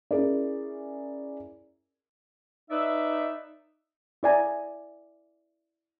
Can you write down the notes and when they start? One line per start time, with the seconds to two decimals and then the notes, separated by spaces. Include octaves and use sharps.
0.11 C#4 E4 G#4 A#4 D5
2.70 D#4 B4 D5 E5
4.23 E4 D5 G#5 A#5